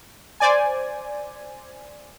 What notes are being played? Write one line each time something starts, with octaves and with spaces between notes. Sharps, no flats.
C5 D5 G#5